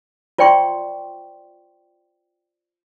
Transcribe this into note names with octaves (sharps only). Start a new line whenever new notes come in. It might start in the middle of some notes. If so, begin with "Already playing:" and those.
F4 C5 D5 G5 C6 C#6